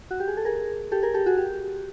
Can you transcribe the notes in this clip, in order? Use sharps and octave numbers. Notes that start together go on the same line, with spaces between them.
F#4
G4
G#4
A4
G#4 A#4
G4 A4
G#4 A#4
G4 A4
F#4 G#4
G4